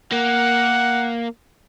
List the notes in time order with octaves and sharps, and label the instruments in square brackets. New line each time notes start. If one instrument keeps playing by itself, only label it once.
[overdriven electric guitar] A#3 [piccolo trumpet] F#5